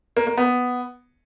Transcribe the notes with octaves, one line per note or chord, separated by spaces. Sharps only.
A#3
A#3
B3